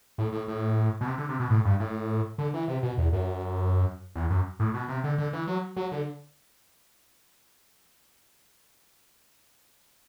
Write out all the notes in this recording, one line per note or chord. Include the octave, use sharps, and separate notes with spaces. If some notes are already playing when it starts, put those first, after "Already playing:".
A2
A2
A2
B2
C3
D3
C3
B2
A2
G2
A2
D3
E3
C3
B2
E2
F#2
E2
F#2
A2
B2
C3
D3
D3
E3
F#3
F#3
D3